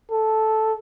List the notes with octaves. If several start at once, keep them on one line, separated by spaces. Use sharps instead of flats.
A4